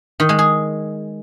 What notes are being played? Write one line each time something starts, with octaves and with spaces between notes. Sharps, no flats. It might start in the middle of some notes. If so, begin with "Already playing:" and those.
D#3
G#3
G#4